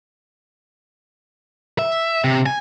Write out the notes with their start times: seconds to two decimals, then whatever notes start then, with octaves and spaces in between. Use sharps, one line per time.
1.79 E5
2.24 C3
2.46 G#5